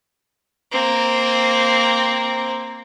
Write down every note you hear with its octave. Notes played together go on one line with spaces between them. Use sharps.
A#3 C4